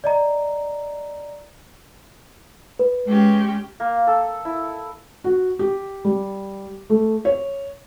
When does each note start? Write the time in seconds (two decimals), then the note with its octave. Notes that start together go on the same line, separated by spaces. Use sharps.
0.04 D5 D#5 A#5
2.79 B4
3.08 G#3 C#4 G4
3.80 A#3
4.07 A4
4.45 E4
5.24 F#4
5.59 G4
6.05 G3
6.90 A3
7.25 C#5